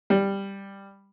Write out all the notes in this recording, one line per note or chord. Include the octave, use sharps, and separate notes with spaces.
G3